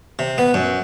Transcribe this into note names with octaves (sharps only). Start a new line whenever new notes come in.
C3
B3
F#2